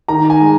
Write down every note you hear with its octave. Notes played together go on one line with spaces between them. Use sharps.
D#3 A#5
G#5
G#3